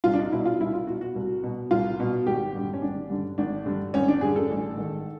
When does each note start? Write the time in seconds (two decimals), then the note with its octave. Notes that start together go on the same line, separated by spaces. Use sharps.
0.04 C2 F4
0.14 D4
0.18 D#4
0.32 B2 E4
0.46 F4
0.60 C2 E4
0.74 F4
0.87 B2 F#4
1.01 F#4
1.16 C2
1.44 B2
1.71 C2 F4
2.00 B2
2.27 G#1 G4
2.55 G2 D3
2.74 C#4
2.82 G#1 D4
3.10 G2 D3
3.38 G#1 D4
3.66 G2 D3
3.94 G#1 C#4
4.08 D4
4.21 G2 D3 G#4
4.36 A4
4.50 A1
4.77 G#2 D#3